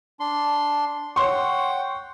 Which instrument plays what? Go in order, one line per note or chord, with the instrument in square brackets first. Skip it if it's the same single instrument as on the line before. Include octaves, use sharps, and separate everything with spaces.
[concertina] D4 C6
[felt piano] C#5 C6 C#6 [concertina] F#5 G5